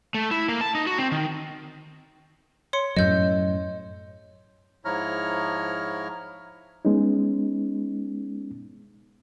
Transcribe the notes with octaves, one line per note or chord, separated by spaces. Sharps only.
A3
E4
A#3
A5
D#4
F#4
C4
D#3
C#5 C6 C#7
F#2 A2 F#3 D#5 G6
G#2 F3 E4 C#5 A#5 F6
G#3 B3 C#4 D#4